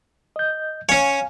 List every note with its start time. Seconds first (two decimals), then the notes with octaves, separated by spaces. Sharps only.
0.36 D#5 G6
0.89 C#4 C#5 F5 G#5